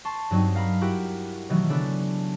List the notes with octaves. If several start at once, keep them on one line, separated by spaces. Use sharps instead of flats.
A5 C6 C#6
G2 F#3 C4 D#4
A#4 F5 A#5 B5
E4 F#4 G4 A#4 F#5
B2 D#3 E3 F#3 A3
C#3 B3 D4 A4